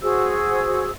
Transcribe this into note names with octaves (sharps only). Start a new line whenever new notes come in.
F#4 G#4 C5 E6